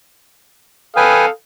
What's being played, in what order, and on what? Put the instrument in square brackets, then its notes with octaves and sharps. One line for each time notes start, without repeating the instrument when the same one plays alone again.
[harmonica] A4 F5 D#6 [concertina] B4 G5 G#5